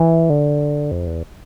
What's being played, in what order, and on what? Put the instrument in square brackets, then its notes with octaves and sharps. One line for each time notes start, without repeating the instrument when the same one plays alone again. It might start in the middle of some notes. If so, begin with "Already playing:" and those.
Already playing: [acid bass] E3
D3
F2
E2